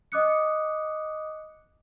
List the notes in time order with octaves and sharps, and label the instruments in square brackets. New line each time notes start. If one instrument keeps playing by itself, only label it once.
[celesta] D#5 D6 D#6 F#6 C#7